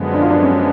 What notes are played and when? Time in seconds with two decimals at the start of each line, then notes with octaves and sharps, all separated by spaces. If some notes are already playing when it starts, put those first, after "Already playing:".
Already playing: F#2 D3 F3 G#3 B3
0.14 D4
0.22 F4
0.30 D4
0.43 C#4